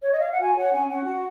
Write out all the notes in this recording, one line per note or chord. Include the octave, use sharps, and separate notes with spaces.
C#5
D#5
F5
F#5
F#4 G#5
C#5 F#5
C#4 G#5
C#4 F#5
F#4